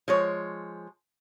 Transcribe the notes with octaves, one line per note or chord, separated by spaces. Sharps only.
F3 G#3 C#5